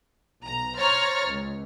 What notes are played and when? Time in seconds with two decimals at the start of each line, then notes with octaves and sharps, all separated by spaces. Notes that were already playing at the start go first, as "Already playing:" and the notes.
0.44 B1 A#5
0.77 C5 C#5 A#5 F6 A6
1.27 C#2